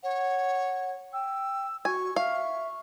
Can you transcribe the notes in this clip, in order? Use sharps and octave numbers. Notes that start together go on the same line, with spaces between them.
C#5 F#5
G5 E6
F#4 G#5 C#6
E5 F5 C#6